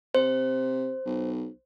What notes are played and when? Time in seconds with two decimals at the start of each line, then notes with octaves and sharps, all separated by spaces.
0.15 C3 C5
1.06 B1